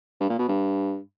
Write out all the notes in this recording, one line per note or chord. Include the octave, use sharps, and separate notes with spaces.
G2
A#2
B2
G2